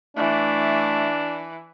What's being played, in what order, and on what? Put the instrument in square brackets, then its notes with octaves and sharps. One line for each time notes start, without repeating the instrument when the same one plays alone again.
[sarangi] E3 [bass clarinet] A3 [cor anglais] D4